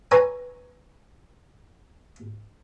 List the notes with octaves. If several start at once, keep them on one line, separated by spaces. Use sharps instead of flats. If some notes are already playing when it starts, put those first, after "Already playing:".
B4 C#5 G#5 A#5